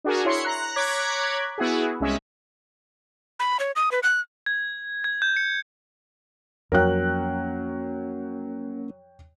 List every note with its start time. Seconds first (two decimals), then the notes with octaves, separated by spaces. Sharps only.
0.04 D4 F#4 G#4 A#4
0.25 E4 C#5 C6 C#7
0.45 A#5 F#6
0.76 C#5 A#5 D6 F#6 G#6 B6
1.58 B3 E4 F#4 G#4
2.00 C2 G#3 C#4 E5
3.40 B5
3.60 C#5
3.76 D#6
3.92 B4
4.03 F#6
4.46 G#6
5.04 G#6
5.22 G6
5.37 C#7
6.72 F2 F#3 A#3 C#4 A#4 C#5 G5 F#6